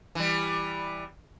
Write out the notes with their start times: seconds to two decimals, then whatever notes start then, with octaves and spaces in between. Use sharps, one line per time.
0.15 E3 G3